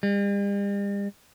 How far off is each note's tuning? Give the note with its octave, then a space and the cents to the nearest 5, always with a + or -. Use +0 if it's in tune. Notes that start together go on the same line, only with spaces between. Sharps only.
G3 +45